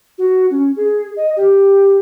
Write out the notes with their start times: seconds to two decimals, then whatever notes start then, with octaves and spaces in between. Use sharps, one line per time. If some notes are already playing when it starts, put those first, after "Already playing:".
0.18 F#4
0.51 C#4
0.76 G#4
1.16 D#5
1.37 G4